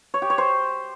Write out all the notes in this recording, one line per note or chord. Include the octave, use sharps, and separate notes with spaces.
C#5
G4
C#5
C5